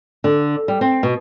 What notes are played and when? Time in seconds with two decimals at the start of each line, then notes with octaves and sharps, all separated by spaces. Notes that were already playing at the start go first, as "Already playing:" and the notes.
0.24 D3
0.68 G3
0.81 C4
1.03 B2